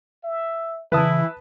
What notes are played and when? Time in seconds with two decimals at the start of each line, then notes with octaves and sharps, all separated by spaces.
0.24 E5
0.92 C#3 E3 E4 B4 A5 D#6